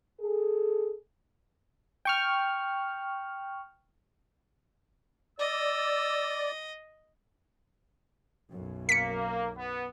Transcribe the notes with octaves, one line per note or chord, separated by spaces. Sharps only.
G#4 A4
G5 C#6 F6
D5 D#5 E6
B1 F#2
A#3 B6 C#7
B3